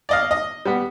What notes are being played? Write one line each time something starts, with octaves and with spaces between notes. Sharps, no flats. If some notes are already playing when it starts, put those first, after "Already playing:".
D5 D#5 F5
D#5
G3 B3